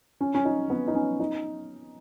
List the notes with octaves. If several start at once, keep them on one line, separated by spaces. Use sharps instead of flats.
C#4
C#4
D#4
B3
D#4
C#4
D#4